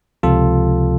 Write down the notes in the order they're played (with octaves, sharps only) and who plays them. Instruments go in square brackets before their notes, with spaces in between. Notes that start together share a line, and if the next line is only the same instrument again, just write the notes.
[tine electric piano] C#2 C3 F3 F4 A4